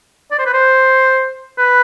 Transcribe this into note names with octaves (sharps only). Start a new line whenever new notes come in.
D5
C5
B4
C5
B4